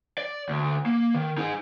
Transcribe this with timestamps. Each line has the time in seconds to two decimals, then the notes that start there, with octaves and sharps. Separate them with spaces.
0.18 D5
0.49 D2
0.86 A#3
1.14 D#3
1.38 D#4 G#4